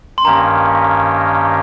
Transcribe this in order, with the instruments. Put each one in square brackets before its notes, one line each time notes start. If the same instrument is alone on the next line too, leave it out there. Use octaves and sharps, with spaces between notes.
[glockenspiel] C6
[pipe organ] G2 D#3 A#3 C#4 G4 [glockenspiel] A#5